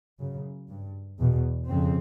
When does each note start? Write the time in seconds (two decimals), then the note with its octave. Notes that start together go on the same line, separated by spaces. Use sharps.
0.19 F#2 C#3
0.69 G2
1.19 E2 B2
1.69 F2 C#3 C4